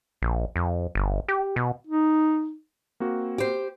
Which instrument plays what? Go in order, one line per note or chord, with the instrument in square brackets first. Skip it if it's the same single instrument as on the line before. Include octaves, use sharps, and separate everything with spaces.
[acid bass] A#1
F2
G1
G4
B2
[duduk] D#4
[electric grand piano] A#3 C4 F#4
[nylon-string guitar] G4 C5